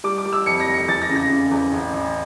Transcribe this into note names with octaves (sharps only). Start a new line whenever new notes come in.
G3 D6
D6
G3
E6
F2 C#7
A#6
F1
C#7
E2 A6
A#6
C#3
A#6
C#3
E2
A1
A1